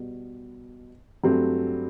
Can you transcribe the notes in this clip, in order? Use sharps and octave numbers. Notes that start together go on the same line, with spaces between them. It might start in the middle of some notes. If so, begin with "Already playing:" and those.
Already playing: B2 G3 B3
G2 F#3 A3 C4